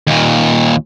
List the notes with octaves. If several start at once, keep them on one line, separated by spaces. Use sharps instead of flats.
D#2 A#2